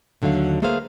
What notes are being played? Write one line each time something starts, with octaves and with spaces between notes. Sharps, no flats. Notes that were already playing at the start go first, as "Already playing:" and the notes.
D#2 D3 F#3 A3 F5
A3 A#3 G#4 B4 C5 F5